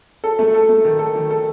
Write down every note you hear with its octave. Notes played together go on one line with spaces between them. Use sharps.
A4
A3
A4
A3
D#3
A4
D#3
A4